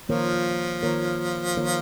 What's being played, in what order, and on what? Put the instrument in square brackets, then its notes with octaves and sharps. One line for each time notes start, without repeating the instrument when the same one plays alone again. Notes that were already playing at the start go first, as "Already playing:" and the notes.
[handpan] D#3 A#3 F4 A#4 C#5 [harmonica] F3
[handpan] D#3 A#3 F4 A#4 C#5
D#3 A#3 F4 A#4 C#5